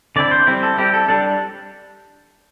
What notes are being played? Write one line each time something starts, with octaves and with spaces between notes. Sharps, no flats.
D3 C4 E4 D5
C5
G3 C4 E4
A4
G3 C4 E4 G4
A4
G3 D4 A4